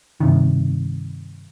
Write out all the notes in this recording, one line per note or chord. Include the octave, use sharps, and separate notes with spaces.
G2 C3 D#3